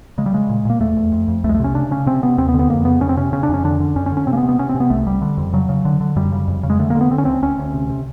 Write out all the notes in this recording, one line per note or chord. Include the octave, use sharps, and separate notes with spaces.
C#3 G#3
G3
C#3 G#3
A#2
A#2 A#3
E2 A3
E2
F2
F2
C2 A3
G#3
A3
C3 C#4
C#3 D4
C#3 C#4
C3 C4
C3 B3
D#2 C4
B3
D3
B3
F2 A#3
C#3 B3
F2 C#4
C4
C3 C#4
C#3 C#4
D4
F2 C#4
D3 D4
D3
F#2 C#4
C#4
D3
C#4
C3 C4
A#3
B3
C3
B3
C3 C#4
C4
C3
B3
C2 A3
C2 G3
D3
F2
C#3 F#3
C#3
D3
D3
F#2 G3
C#3
F2
C#3
G#3
D3 A3
A#3
D3
B3
D3 C4
C#4
D2 C4
D2 C#4
D2
C3
C3